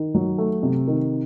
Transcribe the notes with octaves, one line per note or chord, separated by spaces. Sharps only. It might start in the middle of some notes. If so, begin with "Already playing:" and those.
Already playing: D#3
F#3
A3
C3
D#3